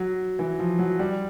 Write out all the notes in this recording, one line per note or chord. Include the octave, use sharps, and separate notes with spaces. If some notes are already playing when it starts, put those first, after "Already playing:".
Already playing: F#3
E3
F3
F#3
G3